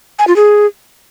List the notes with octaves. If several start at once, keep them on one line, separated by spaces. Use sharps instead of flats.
G#5
F4
G#4